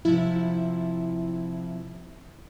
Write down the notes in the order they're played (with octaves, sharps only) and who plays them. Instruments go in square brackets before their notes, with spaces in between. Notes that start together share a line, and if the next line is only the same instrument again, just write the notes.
[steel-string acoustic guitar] C3 F3 [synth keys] E4